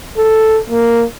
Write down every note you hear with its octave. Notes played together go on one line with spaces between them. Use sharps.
A4
A#3